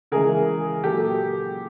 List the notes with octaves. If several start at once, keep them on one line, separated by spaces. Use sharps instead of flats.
C#3 E3 G#3 G#4 A#4
A#2 F#3 G4 A4